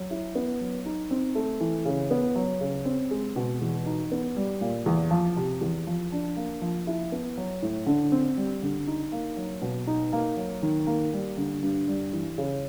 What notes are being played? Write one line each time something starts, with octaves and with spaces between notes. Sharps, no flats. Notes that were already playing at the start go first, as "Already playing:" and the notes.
Already playing: F#3
E4
B3
F#3
D#4
C4
A3
E3
C#3
B3
F#3
C#3
C4
G#3
B2
E2
D#4
B3
G3
A#2
E2
F3
C3
E2
F3
D4
A#3
F3
E4
B3
F#3
A2
D3
C4
G3
D3
D#4
A#3
F#3
B2
D#4
A#3
F#3
D#3
A#3
G3
D3
G2
G3
E3
C#3